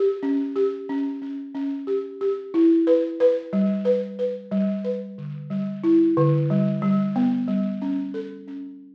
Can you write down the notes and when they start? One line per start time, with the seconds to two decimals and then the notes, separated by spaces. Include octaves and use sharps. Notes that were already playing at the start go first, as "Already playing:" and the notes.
Already playing: G4
0.23 C#4
0.56 G4
0.89 C#4
1.22 C#4
1.55 C#4
1.87 G4
2.21 G4
2.54 E4
2.87 B4
3.20 B4
3.53 G3
3.85 B4
4.19 B4
4.51 G3
4.84 B4
5.18 D3
5.50 G3
5.84 E4
6.17 D3
6.50 G3
6.82 G3
7.16 B3
7.48 G3
7.82 C#4
8.14 A4
8.48 C#4